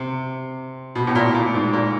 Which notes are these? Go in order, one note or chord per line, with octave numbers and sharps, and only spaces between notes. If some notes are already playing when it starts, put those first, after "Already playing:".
Already playing: C3
B2
A2
A#2
A#2
G#2
A#2